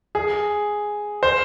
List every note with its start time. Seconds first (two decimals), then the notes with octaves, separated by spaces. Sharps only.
0.15 G#4
1.23 C5